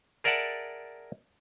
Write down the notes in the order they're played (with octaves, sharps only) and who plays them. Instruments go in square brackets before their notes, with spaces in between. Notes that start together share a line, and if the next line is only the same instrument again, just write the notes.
[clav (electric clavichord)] G#4 A#4 D5 E5 F#5 A5